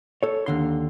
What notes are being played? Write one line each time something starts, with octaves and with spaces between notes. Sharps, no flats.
A4 C#5
D#2 D3 C6